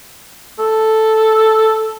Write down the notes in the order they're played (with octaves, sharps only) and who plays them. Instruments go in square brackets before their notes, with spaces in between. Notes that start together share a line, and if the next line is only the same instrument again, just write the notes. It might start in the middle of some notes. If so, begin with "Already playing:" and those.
[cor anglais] A4